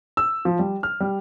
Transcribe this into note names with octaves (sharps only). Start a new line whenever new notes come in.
E6
F3
G3
F6
G3